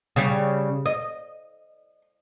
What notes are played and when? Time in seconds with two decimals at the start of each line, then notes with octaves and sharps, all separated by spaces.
0.16 C#3 G3
0.86 D#5